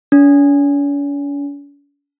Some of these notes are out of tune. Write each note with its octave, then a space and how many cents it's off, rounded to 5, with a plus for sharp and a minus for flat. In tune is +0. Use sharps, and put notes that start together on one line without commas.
C#4 +45